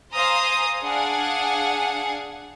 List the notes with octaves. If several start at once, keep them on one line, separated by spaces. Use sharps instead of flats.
C5 F5 G#5 A#5 D#6
D4 G#4 F5 F#5 G#5